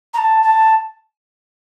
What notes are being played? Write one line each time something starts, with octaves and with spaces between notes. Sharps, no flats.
A#5
A5
A5